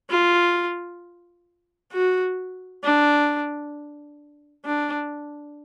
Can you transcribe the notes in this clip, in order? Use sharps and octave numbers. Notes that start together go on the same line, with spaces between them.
F4
F#4
D4
D4